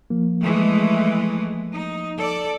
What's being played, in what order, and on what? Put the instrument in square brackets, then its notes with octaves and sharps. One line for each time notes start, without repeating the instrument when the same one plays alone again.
[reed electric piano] F3 A#3
[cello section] E3 G#3 A3
D#4
A4 D5